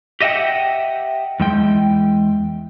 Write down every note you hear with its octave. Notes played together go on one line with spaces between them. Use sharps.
G4 D#5 E5 F#5 G5
E2 G#3 G5